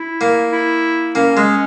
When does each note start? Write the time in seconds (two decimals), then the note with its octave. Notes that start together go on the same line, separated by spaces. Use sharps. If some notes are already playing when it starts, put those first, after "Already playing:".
Already playing: E4
0.21 A#3
0.53 E4
1.15 A#3 C#4
1.37 G#3